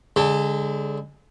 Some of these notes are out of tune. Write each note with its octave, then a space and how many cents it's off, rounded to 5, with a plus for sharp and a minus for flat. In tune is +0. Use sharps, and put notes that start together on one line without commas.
D3 -35 G#3 -15 A5 +25